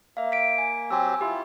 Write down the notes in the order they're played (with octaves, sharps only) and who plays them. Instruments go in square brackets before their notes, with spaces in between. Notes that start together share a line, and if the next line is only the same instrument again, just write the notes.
[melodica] A#3 [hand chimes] E5 F5
[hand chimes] B6 D7
G#5
[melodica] F#3 C4 G4 [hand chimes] G#5 E6
[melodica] E4 F4 [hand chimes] G4